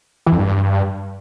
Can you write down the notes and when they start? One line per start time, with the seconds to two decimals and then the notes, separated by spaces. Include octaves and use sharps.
0.26 E3
0.32 F2
0.38 G2